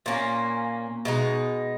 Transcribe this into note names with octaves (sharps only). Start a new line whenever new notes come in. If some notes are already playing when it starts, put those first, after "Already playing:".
A#2 A#3 C#4
B2 G#3 D#4